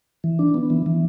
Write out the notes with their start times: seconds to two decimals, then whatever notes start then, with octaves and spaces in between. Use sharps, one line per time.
0.24 E3
0.39 D4
0.54 B3
0.70 E3
0.86 E3